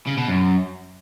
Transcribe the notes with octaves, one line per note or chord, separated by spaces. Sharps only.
C#3
B2
F#2